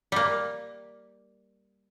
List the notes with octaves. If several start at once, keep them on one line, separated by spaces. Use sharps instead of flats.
G3 A#3